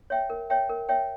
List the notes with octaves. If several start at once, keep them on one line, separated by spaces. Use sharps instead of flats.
C#5 E5 G5
A#4
C#5 E5 G5
A#4
C#5 E5 G5